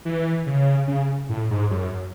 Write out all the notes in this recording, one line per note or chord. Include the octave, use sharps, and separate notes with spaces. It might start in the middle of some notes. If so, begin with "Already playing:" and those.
E3
C#3
C#3
A2
G#2
F#2